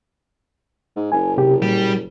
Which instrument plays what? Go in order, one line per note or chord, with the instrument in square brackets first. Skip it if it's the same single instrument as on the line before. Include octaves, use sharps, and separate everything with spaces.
[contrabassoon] G#2
[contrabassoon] F#1 [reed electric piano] G#5
[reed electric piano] C3 G4
[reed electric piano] A#2 [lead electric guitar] G3